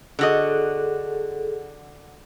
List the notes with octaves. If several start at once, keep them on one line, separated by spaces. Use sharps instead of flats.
D3 F#4 G#4 A4 D#5